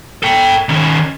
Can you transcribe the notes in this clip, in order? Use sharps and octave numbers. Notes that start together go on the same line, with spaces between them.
A4 G5
D#3 C#4